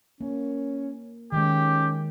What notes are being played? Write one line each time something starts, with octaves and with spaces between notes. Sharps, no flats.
A#3 C#4
D#3 G#3 C#4 G4